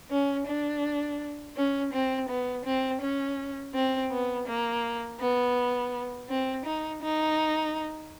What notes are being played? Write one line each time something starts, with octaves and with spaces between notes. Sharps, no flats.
C#4
D4
C#4
C4
B3
C4
C#4
C4
B3
A#3
B3
C4
D#4
D#4